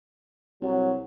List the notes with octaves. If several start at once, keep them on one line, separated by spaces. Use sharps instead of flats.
C2 F#3